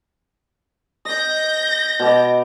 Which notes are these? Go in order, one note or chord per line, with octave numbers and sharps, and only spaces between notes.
D#5 G6 A#6
B2 D6